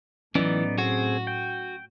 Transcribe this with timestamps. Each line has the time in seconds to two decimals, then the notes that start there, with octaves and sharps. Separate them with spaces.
0.35 A2 E3 F#3 B3 C#4 D#4 D5
0.78 C4 F#4 G#4
1.27 G5